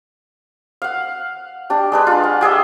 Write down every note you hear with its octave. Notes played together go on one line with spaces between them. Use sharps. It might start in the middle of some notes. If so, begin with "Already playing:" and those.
F5 F#5
D4 G4
G#3 D4 B4
F4 G#5
F#5
G4 G#4 D#5 E5